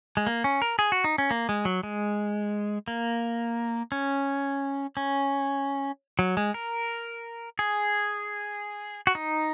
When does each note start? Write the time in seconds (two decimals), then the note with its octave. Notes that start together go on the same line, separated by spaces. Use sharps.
0.17 G#3
0.27 A#3
0.44 C#4
0.62 A#4
0.79 G#4
0.92 F#4
1.04 D#4
1.18 C#4
1.31 A#3
1.49 G#3
1.65 F#3
1.83 G#3
2.88 A#3
3.92 C#4
4.97 C#4
6.19 F#3
6.37 G#3
6.54 A#4
7.59 G#4
9.07 F#4
9.15 D#4